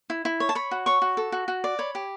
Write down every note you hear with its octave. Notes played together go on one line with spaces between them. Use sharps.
E4
E4
C#5
A5
C#5 B5
F#4
C#5 C#6
F#4
A4
F#4
F#4
D5
C#5 B5
G4